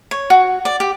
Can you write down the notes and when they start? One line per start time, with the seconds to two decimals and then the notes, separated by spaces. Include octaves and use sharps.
0.11 C#5
0.30 F#4
0.65 D5
0.80 G4